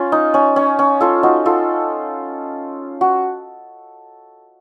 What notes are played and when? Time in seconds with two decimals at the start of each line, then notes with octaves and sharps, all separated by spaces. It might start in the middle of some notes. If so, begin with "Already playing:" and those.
Already playing: C#4 F4
0.12 D#4
0.34 C#4
0.56 C#4
0.79 C#4
1.01 F4 A4
1.23 D#4 F#4
1.46 F4 A4
3.01 F#4